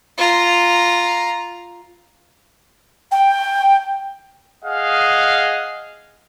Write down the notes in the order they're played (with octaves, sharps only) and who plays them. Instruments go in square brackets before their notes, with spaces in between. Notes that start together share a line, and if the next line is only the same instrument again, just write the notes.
[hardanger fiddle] F4 A#5
[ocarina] G5
[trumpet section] G#4 D#5 F5 F#5